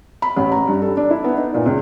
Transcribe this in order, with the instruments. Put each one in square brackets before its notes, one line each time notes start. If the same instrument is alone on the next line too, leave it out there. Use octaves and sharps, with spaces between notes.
[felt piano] B5
A1
A#5
G2
A4
D4
E4
B3
D#4
A#2
C#2